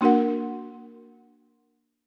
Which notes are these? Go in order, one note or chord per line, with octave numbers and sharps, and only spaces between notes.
A#3 D4 F#4 A#4 F#5